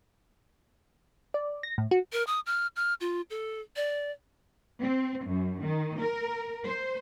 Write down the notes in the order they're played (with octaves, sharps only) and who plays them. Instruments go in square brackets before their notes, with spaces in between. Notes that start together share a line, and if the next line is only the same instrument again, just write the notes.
[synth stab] D5
A#6
A2
F#4
[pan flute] A#4
D#6
F6
F6
F4
A4
D5
[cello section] C4
F#2
D#3
A#4
C5